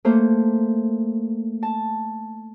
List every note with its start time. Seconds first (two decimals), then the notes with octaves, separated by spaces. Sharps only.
0.05 A3 A#3 C5
1.63 A5